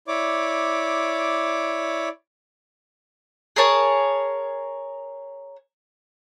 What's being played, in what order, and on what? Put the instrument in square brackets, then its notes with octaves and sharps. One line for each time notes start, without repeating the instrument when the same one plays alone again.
[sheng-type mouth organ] E4 C#5 D5 D6
[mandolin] G#4 A#4 C#5 A5